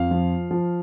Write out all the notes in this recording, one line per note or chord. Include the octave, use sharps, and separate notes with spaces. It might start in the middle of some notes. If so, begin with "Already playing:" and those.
Already playing: F2 F5
F3
F3